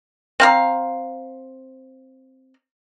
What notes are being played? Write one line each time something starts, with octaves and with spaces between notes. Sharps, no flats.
C4 F5 A#5